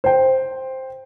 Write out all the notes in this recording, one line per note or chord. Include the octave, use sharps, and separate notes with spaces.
C5 G5